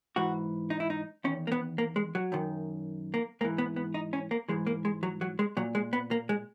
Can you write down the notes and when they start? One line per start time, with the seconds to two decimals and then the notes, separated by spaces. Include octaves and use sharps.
0.16 G#2 E3 F#4
0.70 D#4
0.80 E4
0.90 D#4
1.24 E2 D#3 C#4
1.47 A#3
1.52 B3
1.78 A#3
1.96 G#3
2.15 F#3
2.32 F#2 D#3
3.14 A#3
3.41 G#2 A#3
3.44 E3
3.58 B3
3.76 B3
3.94 D#4
4.13 C#4
4.31 A#3
4.49 G#2 E3 G#3
4.67 A#3
4.85 G#3
5.03 F#3
5.21 F#3
5.39 G#3
5.57 A#2 F#3
5.75 G#3
5.93 B3
6.11 A#3
6.29 G#3